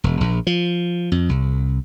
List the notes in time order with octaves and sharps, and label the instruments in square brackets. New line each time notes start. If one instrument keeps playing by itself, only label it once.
[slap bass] E1
A#1
F3
F2
C2